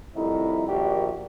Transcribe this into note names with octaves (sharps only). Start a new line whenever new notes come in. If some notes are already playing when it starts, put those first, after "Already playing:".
C2 F2 A2 D#4 E4
A#1 D#3 D4 F#4 G4